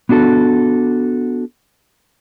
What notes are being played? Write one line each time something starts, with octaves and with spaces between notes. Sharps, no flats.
B3 D4 F#4 A4